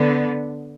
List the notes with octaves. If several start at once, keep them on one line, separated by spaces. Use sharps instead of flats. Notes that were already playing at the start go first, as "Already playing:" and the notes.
Already playing: D3 B3